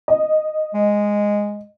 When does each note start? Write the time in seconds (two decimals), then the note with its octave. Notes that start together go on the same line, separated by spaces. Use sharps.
0.08 D#5
0.74 G#3